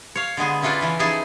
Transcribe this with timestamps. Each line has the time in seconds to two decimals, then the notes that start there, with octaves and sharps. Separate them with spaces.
0.15 C#5 F5
0.37 D3 G#3 B3 G#4
0.62 C#4 E4 F4 A4 B4 D5
0.81 C#3 E3 C#4
0.99 F3 C#4 D#4 E4 G#4 A5